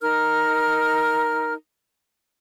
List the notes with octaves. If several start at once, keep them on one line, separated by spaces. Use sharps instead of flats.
D#4 A#4 F6